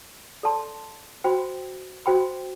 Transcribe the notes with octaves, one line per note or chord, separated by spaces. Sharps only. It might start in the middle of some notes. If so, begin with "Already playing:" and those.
A4 D5 A5 C6
F#4 C5 G5 B5
F#4 C5 G5 B5